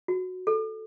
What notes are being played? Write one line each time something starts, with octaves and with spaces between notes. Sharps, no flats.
F#4
A4